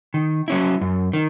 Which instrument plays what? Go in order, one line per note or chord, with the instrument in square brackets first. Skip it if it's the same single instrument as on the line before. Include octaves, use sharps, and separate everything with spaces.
[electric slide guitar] D#3
F#3 C#4 E4
F#2
D#3